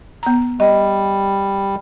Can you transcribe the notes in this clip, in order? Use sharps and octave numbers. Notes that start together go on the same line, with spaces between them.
B3 A#5
G3 D#5